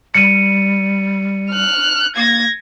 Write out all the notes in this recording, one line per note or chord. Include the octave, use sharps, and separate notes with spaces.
G3 C#7 D#7
F6 F#6
A#3 G#6 A#6